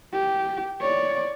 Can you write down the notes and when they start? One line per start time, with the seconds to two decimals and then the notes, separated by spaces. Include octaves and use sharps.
0.13 G4
0.81 C#5 D5